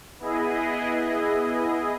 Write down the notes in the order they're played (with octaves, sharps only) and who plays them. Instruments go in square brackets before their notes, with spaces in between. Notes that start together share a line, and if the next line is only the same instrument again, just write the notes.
[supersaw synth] B3 E4 G#4 D#5